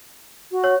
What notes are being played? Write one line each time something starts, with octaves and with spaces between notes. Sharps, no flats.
F#4
C#5